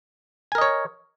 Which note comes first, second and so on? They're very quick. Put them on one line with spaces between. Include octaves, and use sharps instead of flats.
G#5 A#4 D#5 C#5